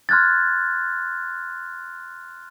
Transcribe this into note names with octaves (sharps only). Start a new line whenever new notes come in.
C6 F6 F#6 G#6 A6